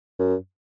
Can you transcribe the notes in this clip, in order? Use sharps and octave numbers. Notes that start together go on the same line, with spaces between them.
F#2